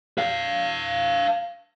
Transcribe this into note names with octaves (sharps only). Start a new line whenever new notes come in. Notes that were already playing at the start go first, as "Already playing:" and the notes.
B4 F5